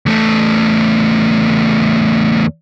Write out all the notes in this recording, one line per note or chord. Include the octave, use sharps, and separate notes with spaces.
E2 A3